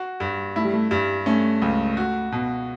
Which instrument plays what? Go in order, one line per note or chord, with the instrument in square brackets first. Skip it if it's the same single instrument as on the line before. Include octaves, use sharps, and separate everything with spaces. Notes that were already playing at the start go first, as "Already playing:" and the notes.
Already playing: [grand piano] F#4
G2
[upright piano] A3 [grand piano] E4
[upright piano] G3
A3
[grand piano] G2 [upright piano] G3
[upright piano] A3 [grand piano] C#4
[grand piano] C#2
F#4
B2